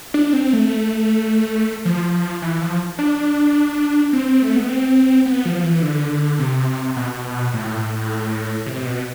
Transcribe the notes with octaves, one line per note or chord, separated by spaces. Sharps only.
D4
C4
A3
F3
E3
F3
D4
C4
A3
B3
C4
B3
F3
E3
D3
C3
B2
A2
C3
B2